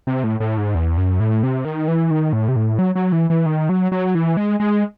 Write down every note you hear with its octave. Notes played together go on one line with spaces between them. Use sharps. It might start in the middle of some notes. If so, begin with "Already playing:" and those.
C3
A2
A2
G#2
E2
F#2
A2
C3
D#3
E3
D#3
A2
C3
A2
F#3
F#3
E3
E3
D#3
F#3
F#3
E3
G#3
G#3